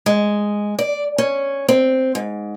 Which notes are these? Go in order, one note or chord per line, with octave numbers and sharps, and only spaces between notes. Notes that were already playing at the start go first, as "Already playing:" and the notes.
G#3
D5
C#4
C4
G#2